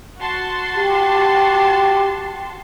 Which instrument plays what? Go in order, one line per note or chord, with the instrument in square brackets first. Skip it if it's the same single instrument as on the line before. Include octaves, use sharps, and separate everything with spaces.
[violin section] F#4 A5 C6
[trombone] G4